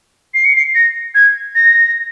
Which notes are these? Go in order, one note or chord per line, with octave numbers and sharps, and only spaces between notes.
C7
C#7
C7
A#6
G#6
A#6